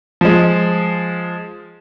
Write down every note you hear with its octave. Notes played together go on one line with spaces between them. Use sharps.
F3 G#3